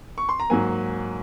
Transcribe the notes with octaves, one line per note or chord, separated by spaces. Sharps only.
C#6
C6
A#5
G#2 F#3 A#3 G#5